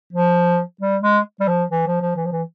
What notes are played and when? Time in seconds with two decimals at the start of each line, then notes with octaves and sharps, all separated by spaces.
0.13 F3
0.81 G3
1.03 G#3
1.40 G3
1.48 F3
1.71 E3
1.87 F3
2.01 F3
2.16 E3
2.25 F3
2.32 E3